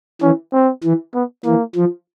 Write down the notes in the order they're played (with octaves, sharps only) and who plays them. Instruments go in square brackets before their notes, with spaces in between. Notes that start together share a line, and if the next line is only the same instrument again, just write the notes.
[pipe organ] E3 [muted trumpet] C#4
[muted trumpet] C4
[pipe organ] E3
[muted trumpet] B3
[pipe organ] E3 [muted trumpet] A#3
[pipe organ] F3